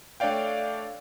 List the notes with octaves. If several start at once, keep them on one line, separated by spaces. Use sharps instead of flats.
A3 D4 C#5 D5 F5 G5